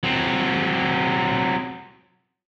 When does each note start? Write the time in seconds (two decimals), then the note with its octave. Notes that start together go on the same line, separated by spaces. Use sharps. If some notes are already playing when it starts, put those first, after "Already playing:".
0.03 F#3 C4